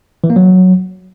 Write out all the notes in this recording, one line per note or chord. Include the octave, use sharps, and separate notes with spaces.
E3
A#3
F#3